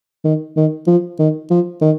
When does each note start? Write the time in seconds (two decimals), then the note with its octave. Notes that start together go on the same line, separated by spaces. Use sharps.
0.24 D#3
0.57 D#3
0.87 F3
1.19 D#3
1.51 F3
1.81 D#3